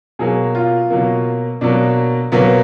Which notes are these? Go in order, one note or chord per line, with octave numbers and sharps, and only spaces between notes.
B2 F#3 A#3 G#4
F4
B2 F#3 A#3
B2 F#3 A#3 D4
B2 F#3 A#3 B3